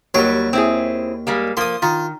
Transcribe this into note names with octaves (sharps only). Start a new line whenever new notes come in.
D#2 F#3 G3 C#5
C4 E4 G#4
G3 G#3 A#3
F3 A#3 C6 D#6
D#3 F4